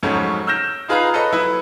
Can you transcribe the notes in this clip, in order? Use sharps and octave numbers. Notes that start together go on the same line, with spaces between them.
F2 G#2 C#3 F#3 A3 C#4
E6 F6 G6 A#6 E7
D#4 F4 G#4 B4 F5 A#5
A4 B4 C#5 D#5
F#3 E4 B4 E5